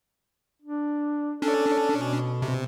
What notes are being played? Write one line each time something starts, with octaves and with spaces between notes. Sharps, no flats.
D4
C#4 D4 A4
B2
C3